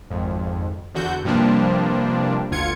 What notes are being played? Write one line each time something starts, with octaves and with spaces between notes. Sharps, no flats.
G#1 F2
E2 D3 F#4 G6
G2 C3 F3 G3 A#3 D4
G1 D2 D3 F4 G#6 C#7